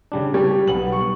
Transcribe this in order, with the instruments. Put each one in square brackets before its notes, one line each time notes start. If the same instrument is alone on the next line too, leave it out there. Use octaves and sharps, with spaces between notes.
[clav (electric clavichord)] C#3 G3 D4
[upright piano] G3 [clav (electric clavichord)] C#5
[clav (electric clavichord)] B1 B3 [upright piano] F#7
[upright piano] C#6